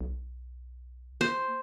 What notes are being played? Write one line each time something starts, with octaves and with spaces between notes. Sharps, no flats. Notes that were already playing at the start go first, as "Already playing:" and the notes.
B1
A#3 C5